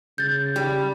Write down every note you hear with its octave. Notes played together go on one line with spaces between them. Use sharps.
C#3 G6 A6
G3